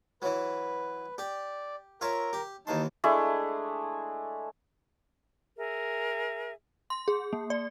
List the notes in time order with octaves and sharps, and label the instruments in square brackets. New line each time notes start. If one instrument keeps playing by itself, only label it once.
[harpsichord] E3 F#3 [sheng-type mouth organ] B4
[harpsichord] G4 [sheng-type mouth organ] D5
[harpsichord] F4 C#5 E5 [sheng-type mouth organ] A#4
[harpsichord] G4
[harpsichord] D#2 E3 C6 [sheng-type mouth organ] D#4 A5
[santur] G#3 A3 D4 E4
[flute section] G#4 A#4 E5
[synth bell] C6
G#4
A#3
D5